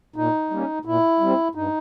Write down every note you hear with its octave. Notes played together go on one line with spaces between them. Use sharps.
A#2 D#4
G3 A#3 C#4
A#2 E4
G3 C4
G2 D#4